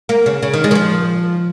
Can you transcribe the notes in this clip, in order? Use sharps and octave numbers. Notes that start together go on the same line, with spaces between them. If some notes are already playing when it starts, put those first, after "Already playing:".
A#3
C#3
C#3
D#3
G#3
D#3
F3